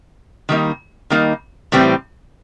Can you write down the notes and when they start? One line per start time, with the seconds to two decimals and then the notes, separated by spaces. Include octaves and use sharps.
0.49 D#3 G3 A#3 D#4
1.10 D#3 G3 A#3 D#4
1.72 A2 E3 G3 C4